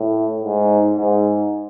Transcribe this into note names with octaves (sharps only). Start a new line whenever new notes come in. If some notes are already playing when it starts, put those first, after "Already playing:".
Already playing: A2
G#2
G#2